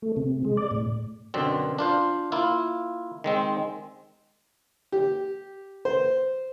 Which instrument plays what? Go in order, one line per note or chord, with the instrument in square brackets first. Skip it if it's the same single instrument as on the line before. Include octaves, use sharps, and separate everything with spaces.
[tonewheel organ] A3
C3
G#3
D5
A2
[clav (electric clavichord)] F#2 B2 D3 C4
D4 F4 C5
A#3 E4 F4
D#3 G#3 C4
[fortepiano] G4
C5